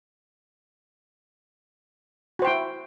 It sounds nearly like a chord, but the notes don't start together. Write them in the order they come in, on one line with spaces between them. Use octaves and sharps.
F#4 C5 G5 E4